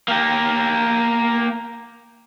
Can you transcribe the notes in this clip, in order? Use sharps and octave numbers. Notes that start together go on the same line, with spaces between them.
A#3 G4